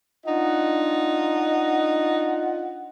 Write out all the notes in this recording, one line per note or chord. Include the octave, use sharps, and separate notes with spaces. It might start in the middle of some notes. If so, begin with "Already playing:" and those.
D4 D#4 F4 D#5 F#5